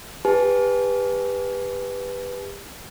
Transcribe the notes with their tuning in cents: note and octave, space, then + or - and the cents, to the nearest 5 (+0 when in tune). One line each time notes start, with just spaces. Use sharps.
G4 +35 B4 +0 G#5 +45